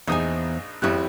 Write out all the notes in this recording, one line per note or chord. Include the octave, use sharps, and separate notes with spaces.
A#1 E2 D#4 C5 G#5 D#6
G#1 F2 E4 G4 F#6